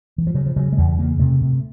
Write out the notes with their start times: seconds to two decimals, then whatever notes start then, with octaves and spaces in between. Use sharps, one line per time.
0.18 E3
0.27 F3
0.35 C#3 F#3
0.46 F3
0.56 C#3 F#3
0.72 G#3
0.77 E2 G3
0.99 C#3 A#3
1.19 C3 A3
1.41 C3